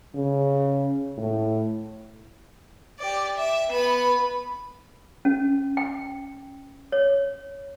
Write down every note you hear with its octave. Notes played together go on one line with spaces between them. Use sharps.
C#3
A2
G4 D5
E5
B3 B5
C#4
G5
C#5